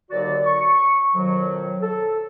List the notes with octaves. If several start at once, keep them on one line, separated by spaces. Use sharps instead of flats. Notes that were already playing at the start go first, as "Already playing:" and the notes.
D#2 D3 F#3 F#4 D5
C#6
F2 B2 D#3 F#3
A4